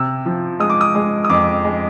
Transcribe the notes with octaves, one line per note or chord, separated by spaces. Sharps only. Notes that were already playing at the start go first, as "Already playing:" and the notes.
Already playing: C3 E6
F3
G#3 D#6
D6
D#6
G#3
D#6
F2 D6
G#3